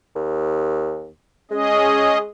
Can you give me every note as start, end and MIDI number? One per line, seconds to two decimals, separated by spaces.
0.16 1.10 39
1.51 2.27 56
1.51 2.18 61
1.51 2.18 68
1.51 2.18 75